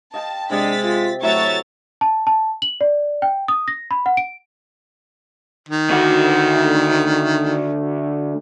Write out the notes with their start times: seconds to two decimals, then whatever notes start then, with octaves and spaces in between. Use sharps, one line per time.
0.14 D#5 F5 G5 A5
0.50 C3 G#3 D4 A6 B6
0.84 F4
1.22 A2 F#3 A3 C#5 E5 A6
2.01 A5
2.27 A5
2.62 F#7
2.81 D5
3.22 G5
3.48 D#6
3.68 A#6
3.91 B5
4.06 F#5
4.17 D7
5.69 D#3
5.90 D2 F#4